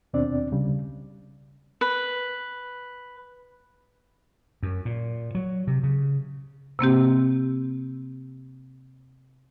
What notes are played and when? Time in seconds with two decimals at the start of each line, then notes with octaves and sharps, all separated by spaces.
0.13 D#2 B2 C4 D4 D5
0.52 C2 C#3 G3
1.81 B4
4.63 F#2
4.85 A#2
5.35 F#3
5.67 C3
5.83 C#3
6.79 C3 A#3 C4 G4